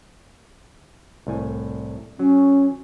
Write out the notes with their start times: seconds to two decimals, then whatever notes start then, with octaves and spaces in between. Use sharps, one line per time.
1.27 C2 A2 G#5
2.19 F#3 C#4